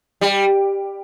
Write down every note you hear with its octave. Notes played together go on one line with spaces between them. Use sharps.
G3